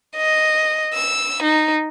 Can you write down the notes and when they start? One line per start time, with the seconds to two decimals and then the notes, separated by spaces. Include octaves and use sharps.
0.16 D#5
0.94 E6
1.43 D#4